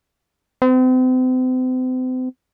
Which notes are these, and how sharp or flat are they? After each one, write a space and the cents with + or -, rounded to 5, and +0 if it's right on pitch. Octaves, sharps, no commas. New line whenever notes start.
C4 -40